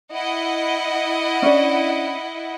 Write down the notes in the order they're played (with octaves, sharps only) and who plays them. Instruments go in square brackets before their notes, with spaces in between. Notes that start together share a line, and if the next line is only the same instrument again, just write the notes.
[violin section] E4 D#5 F#5
[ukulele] C#4 D4 D5